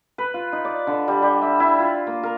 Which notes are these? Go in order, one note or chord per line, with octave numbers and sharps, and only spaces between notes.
B4
F4
D#4
D5
D3
G3
G3
E5
E4
F4
A#3
A#4